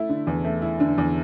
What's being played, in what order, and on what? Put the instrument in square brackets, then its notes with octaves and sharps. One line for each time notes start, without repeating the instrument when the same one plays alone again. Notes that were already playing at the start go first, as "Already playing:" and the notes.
Already playing: [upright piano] A3 E4
D3
E2
A3
E4
D3
E2